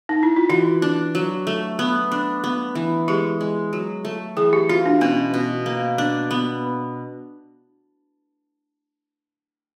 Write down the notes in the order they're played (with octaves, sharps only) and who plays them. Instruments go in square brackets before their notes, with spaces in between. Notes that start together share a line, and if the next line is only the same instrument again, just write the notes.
[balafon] D#4
E4
F4
[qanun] E3 [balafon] F#4
[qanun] D4
F#3
A3
B3
D4
B3
E3
[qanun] G#3 [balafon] G4
[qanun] G#3
F#3
A3
[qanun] E3 [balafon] G#4
[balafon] G4
[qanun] F4 [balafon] F#4
[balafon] D4
[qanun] B2 [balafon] C#4
[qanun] B2
A#3
D4
B3